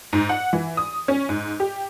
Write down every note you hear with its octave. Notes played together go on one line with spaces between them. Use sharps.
G#2
F#5
E3
D#6
C#4
G#2
G4